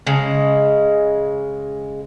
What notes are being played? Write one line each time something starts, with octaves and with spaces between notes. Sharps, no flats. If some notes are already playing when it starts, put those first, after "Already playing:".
C#3 G#3